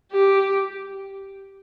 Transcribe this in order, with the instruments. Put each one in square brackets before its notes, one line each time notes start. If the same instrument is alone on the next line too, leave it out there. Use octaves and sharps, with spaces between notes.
[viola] G4